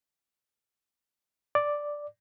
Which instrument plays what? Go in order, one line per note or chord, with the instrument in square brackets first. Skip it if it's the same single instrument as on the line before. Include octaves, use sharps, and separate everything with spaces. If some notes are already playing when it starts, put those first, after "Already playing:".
[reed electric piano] D5